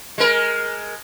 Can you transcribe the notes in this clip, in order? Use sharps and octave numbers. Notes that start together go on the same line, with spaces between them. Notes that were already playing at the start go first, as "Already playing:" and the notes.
G#3 A#4